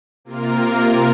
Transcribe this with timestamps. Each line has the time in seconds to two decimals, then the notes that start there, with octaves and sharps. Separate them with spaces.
0.25 C3 A#3 F4 A#4